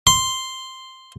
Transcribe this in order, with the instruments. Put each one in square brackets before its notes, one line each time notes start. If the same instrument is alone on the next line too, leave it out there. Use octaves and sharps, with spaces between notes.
[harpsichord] C6